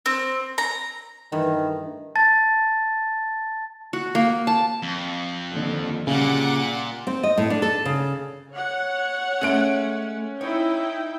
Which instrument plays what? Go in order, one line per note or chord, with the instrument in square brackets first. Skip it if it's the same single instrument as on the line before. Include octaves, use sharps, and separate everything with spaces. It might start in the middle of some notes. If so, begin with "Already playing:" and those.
[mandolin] C4
A#5
[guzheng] G2 E3 A3 [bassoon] D#3
[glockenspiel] A5 A6
[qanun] F#4
A#3
A5
[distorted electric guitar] F2
[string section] D#2 [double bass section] D3
[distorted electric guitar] A#2 [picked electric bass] C#3 [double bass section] G3 [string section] F#5 D6
[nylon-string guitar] C4
D#5
A2
D4
A4
C#3
[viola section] C#5 F#5
[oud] G#3 A3 [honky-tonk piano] C#4 D7
[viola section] D#4 E4 G5 [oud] C#5